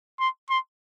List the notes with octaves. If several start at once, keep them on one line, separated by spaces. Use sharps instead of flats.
C6
C6